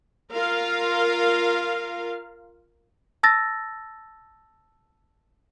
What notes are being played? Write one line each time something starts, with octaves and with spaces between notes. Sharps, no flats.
F4 A#4 F5
A5 E6 A6 A#6